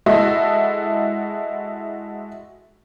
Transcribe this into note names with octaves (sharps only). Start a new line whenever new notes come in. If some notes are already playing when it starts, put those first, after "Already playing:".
G#3 E4 F#4 A4 D#5 E5